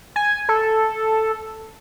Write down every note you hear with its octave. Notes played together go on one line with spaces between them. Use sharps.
G#5
A4